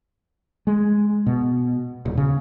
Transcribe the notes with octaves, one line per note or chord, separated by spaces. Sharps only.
G#3
B2
D#1
C#3